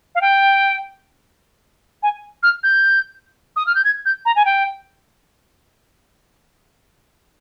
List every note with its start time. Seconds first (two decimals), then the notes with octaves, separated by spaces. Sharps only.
0.15 F5
0.21 G5
2.03 G#5
2.43 F6
2.63 G6
3.56 D#6
3.67 F6
3.75 G6
3.84 G#6
4.05 G6
4.25 A#5
4.36 G#5
4.45 G5